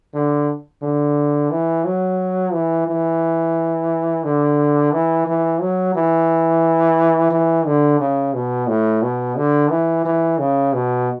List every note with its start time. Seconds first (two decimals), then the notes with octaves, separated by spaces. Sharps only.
0.14 D3
0.82 D3
1.51 E3
1.85 F#3
2.53 E3
2.87 E3
4.24 D3
4.92 E3
5.26 E3
5.61 F#3
5.95 E3
7.31 E3
7.66 D3
8.00 C#3
8.34 B2
8.67 A2
9.02 B2
9.36 D3
9.70 E3
10.05 E3
10.39 C#3
10.74 B2